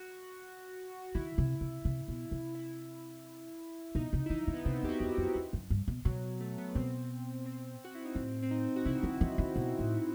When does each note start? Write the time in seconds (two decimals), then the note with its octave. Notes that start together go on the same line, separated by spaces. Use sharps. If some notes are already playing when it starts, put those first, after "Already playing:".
Already playing: F#4
1.15 D#3 E4
1.38 C3
1.61 C3
1.85 C3
2.08 B2
2.31 C3
2.55 E4
3.95 B2 D#4
4.13 C3
4.26 E4
4.30 E3 D#4
4.48 D#3
4.53 B3
4.65 C3 C4
4.83 E2 G4
4.89 F#4
5.00 E2
5.18 F#2
5.35 E2
5.53 F#2
5.70 G2
5.88 B2
6.05 B2 F#3
6.40 A3
6.58 B3
6.75 B2 C4
7.46 C4
7.85 F#4
7.95 E4
8.05 D#4
8.15 A2 C4
8.43 C4
8.51 D#4
8.76 F#4
8.85 C3 E4
9.03 D#3
9.21 E3
9.38 D#3
9.56 B2
9.79 A2